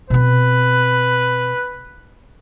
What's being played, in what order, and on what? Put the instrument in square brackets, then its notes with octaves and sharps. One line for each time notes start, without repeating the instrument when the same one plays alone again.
[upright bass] B2 C4 [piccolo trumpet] B4